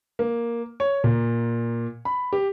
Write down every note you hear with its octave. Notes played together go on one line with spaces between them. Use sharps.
A#3
C#5
A#2
B5
G4